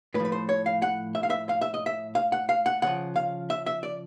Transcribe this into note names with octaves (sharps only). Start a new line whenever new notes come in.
A2 B4
F3
B4
C5
C#5
F5
F#5
E5
F5
E5
F5
E5
D#5
E5
F5
F#5
F5
F#5
C#3 F3 F#5
F5
E5
E5
D5